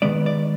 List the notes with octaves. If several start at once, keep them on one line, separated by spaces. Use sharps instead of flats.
D#3 G#3 B3 D5
D5